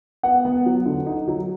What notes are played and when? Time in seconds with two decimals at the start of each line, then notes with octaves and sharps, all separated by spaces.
0.23 B3 F#5
0.45 B3
0.66 F#3
0.86 D3
1.06 D#4
1.28 F#3